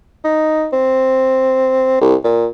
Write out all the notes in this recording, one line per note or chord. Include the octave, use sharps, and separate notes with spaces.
D#4
C4
C2
A#2